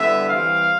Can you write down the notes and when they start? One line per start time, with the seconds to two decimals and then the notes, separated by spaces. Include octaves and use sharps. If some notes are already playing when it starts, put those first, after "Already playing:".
Already playing: D3 G3 B3 E4 E5
0.29 E3 G3 C4 F5